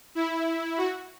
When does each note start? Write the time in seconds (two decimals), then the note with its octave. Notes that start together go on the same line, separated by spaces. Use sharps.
0.15 E4
0.77 F#4